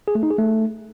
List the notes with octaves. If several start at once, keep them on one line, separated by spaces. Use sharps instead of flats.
G#4
A3
D#4
G#4
A3